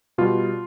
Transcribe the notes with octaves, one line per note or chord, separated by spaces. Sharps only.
B2 G3 F4